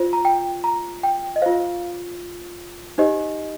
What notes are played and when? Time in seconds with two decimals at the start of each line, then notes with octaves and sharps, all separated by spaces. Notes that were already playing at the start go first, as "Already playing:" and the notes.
Already playing: F4 C5
0.13 A#5
0.25 G5
0.64 A#5
1.03 G5
1.36 D#5
1.42 F4 C5 F5
2.98 D#4 G4 C5 D#5